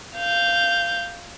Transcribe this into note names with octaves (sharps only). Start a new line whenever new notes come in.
F5 G6